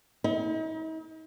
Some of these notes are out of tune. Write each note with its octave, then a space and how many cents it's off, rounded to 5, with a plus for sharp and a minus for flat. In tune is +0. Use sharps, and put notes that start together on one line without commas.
D#4 +45